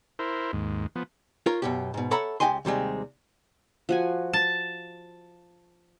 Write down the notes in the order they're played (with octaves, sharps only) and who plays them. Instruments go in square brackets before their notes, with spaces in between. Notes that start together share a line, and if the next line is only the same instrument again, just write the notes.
[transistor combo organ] E4 A#4 C5
D#2 G#2
F3 B3
[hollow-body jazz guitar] F4 A#4 C#5
F#2 B2 G4
G#2 B2
A4 C#5 E5 F#5 A#5 B5
C#2 D#3 G4 D#5 G#5 C6
D#2 C3 G3 G#3
[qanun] F3 F#4 G#5
[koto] A5